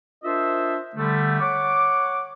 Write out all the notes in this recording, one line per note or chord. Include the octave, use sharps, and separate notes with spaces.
D4 F4 A#4 C5 D#5 E5
D3 G3 A3
C#5 F#5 C#6 D6